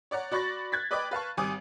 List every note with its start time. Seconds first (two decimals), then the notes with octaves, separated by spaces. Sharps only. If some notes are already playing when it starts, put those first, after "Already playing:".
0.11 C#5 D5 F#5 A#5
0.31 F#4 D5 B5 C#6 A6 A#6
0.72 F#6 G#6 A6 B6
0.91 B4 D5 D#5 G5 B5 D6
1.11 B4 F5 A5 C#6
1.37 G#1 G3 G#5 D6 D#6